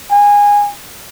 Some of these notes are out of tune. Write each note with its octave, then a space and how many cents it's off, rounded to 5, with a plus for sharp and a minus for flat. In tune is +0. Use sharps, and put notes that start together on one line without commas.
G#5 -20